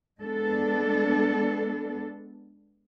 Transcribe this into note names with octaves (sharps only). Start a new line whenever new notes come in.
G#3 B3 D4 A4